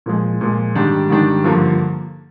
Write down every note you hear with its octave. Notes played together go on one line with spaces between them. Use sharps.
A#2 F3 G#3
A#2 F3 G#3
G#2 D#3 G3 D4
G#2 D#3 G3 D4
G2 D3 F3 A#3